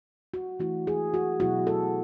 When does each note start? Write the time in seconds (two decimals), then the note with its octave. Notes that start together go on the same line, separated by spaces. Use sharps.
0.34 F#4
0.59 E3 A3 E4 F#4
0.87 G#4
1.14 F#4
1.40 B2 F#3 B3 E4 F#4
1.67 A4